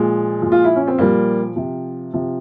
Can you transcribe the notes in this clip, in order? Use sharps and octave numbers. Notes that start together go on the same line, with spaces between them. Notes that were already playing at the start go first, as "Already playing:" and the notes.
Already playing: A#2 F3 G#3
A#2 F3
F4
E4
C#4
C4
A#2 F3 G3 A#3
C3 F3
C3 F3